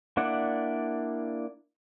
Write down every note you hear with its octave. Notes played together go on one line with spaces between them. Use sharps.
A#3 D4 E4 D5 F#5